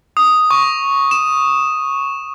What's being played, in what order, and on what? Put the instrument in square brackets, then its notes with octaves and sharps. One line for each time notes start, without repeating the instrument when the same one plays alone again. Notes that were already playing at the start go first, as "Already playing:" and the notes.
[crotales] D#6
C#6
E7